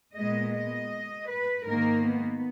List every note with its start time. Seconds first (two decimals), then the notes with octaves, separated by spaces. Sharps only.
0.16 A#2 G#3 B3 D#5
0.54 D#5
1.30 B4
1.66 G#2 D#3 A#3 A#4
2.04 B3